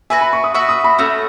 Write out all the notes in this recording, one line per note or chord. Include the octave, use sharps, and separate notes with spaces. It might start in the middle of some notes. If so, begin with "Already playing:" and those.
F#4 B4 E5 G#5
B5
C#6
D#6
F#4 B4 E5 C#6
D#6
B5
A3 C#4 F#4 E6